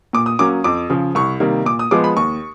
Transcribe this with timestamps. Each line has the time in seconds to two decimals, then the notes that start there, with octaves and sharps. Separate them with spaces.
0.13 A#2 D6
0.26 D#6
0.39 F#3 A#3 C#4 D6
0.64 F2 D6
0.90 C#3 F3
1.15 C2 C#6
1.40 C3 D#3 G3 A#3
1.65 A#2 D6
1.79 D#6
1.91 F3 G#3 B3 D6
2.04 B5
2.16 D#2 C#6